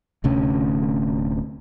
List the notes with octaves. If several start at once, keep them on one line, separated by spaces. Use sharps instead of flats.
D1 D2 C3 C#4